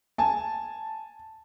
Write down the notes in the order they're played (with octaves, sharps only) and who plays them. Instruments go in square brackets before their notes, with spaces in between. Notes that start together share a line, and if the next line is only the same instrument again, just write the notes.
[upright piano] G#5 A5